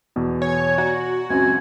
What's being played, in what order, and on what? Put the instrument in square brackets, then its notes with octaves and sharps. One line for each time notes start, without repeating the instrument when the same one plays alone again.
[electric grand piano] E2 B2
[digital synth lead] C#5 [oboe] G#5
[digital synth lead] F#4 [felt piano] D5 [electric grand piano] A#5
[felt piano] C#2 F#2 C4 [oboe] G#5